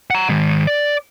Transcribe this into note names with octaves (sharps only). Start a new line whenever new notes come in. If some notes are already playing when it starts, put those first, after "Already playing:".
F#5 A#5
D#3 G#3
D5